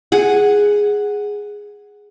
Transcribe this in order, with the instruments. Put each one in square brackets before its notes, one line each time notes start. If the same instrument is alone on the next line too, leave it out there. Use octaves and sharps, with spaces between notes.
[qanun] G#4 F#5